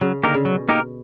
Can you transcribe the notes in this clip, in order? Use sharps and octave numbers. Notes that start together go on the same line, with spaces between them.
C#3 F#3
D3 A#3 D#4 G4 A#4
C#3
B2 F#3
A#3 D#4 G4 A#4